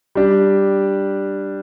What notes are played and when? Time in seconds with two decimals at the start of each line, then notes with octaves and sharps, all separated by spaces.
0.15 G3 D4 G4